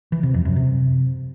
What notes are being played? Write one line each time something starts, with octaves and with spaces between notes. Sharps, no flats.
E3
C3
F2
F#2
C3